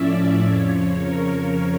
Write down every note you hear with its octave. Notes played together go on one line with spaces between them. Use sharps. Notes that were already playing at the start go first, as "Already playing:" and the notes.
Already playing: A2 F3 A3 C#4 D5 E5
F2 C#3 F3 C#5
A#4